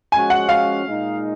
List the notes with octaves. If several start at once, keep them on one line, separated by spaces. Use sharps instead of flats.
F3 G#3 C#4 F#4 G#5
F#5
F5
A#2 G#3 D#4